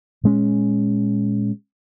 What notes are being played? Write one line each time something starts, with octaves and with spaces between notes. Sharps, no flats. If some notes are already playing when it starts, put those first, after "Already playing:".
A#2 G#3 C#4